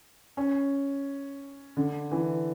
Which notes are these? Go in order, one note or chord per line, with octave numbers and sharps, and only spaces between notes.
C#4
D3
E3